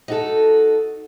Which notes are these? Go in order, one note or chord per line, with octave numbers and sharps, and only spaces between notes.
D#4 F#4 A4